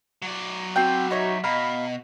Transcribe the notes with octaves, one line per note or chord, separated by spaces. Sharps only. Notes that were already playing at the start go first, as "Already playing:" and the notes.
F#3 D5
C4 F#4 G5
D#4 C#5 E5
B2 D#5 F5 A#5 B5